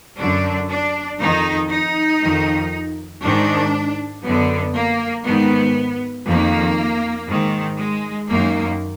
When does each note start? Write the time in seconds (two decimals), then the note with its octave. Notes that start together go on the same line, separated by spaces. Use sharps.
0.18 F#2 D3 D4
0.69 D4
1.20 F2 D#3 D#4
1.70 D#4
2.21 F2 D#3
3.23 G#2 D#3 D4
4.24 F#2 D3 B3
4.75 A#3
5.25 G#2 D#3 B3
6.26 F2 D#3 A#3
7.28 G#2 D#3
7.79 G#3
8.30 F#2 D#3 A#3